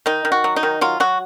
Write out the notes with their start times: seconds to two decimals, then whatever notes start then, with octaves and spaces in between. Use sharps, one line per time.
0.06 D#3 D#4
0.25 D#3
0.32 F#4
0.44 F#3
0.56 D#4
0.63 D#3
0.81 F#3 F4
1.00 F#3 F#4